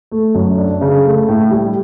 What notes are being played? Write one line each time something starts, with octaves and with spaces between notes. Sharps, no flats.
A3
F#2
D4
C#3
A3
A2
G3